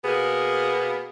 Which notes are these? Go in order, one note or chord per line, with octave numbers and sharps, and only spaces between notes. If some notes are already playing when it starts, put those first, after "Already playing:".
B2 A#3 B3 G#4